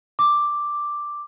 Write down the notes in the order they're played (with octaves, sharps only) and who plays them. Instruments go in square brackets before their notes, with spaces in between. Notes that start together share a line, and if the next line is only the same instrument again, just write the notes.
[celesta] D6